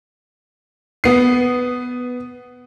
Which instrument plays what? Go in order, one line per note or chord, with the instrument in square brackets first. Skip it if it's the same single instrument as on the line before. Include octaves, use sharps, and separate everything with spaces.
[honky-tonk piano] B3 C7